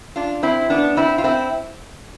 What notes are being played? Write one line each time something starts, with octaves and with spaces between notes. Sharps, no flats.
D4 F4
C4 E4
B3 D4
C4 E4
F4
C4 E4